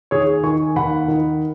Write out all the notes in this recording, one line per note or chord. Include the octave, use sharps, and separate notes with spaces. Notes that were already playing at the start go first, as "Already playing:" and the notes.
D#2 G#4 C#5
D#3 G#5 C#6
D#2 F#5 B5
D#3